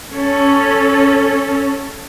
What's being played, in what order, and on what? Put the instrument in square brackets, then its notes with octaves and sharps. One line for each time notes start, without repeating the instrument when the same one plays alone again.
[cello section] C#4 A4